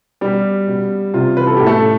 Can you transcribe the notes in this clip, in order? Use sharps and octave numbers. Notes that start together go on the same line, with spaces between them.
B2 G3 G4
B2
C3 F4
E3 B4
A4
A2 G4
A3 A4